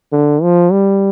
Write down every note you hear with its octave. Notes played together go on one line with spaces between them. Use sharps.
D3
F3
G3